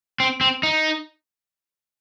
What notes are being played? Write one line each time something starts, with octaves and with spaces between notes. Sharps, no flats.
C4
C4
D#4